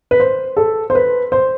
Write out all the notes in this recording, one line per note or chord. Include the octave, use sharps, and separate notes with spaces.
B4
C5
A4
C5
B4
C5